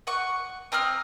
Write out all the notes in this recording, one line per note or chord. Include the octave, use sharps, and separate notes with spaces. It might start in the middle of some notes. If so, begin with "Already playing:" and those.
F#5 C#6
C4 A#5 D#6 F6